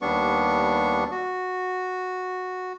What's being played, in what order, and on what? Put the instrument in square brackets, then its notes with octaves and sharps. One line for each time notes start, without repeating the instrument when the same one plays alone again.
[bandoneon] D#2 G3 B3 D4 C#6
F#4